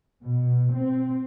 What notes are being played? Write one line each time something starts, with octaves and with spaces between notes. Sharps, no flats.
B2
C4